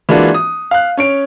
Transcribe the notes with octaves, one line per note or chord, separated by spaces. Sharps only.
E3 G#3 A#3 D4 F4 F#4
D#6
F5 F#6
C#4 C#5 D7